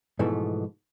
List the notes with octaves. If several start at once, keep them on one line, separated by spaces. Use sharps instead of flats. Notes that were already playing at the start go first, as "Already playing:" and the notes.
G#2 B2 E3 F3 A3